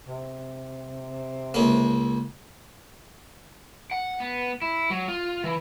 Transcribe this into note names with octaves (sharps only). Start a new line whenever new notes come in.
C3
C#2 A#3
F#5
B3
E4
F#3
F4
E3